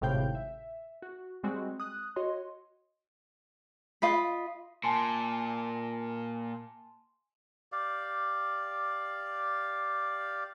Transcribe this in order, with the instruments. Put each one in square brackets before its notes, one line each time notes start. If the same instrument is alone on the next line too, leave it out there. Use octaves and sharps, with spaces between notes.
[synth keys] G#1 A2 C3 F5 G5 G6
E5
F#4
G3 G#3 C4 F#4
D#6 F#6
F#4 C#5 D#5 C6
[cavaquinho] F4 D#5 B5
[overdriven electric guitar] A#2 [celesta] G#5 A5 C6
[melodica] G4 D5 F5